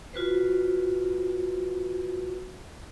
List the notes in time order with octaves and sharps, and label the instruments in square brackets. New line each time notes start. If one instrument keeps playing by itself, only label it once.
[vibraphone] F4 F#4 B4 C5